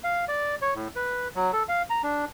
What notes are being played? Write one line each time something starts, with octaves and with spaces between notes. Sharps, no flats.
F5
D5
C#5
A2
B4
F#3
A4
F5
A#5
D4